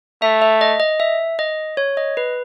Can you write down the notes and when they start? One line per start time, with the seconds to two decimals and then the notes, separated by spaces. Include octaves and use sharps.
0.22 A3 E5
0.42 E5
0.61 D#5
0.80 D#5
1.00 E5
1.39 D#5
1.77 C#5
1.97 D#5
2.17 B4